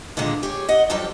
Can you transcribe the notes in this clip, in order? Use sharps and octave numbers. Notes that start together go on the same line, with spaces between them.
A#2 D3 D#3 G#3
G4 G#4 C#5
D#5 F#5
F2 F#3 G3 G4 A4 G5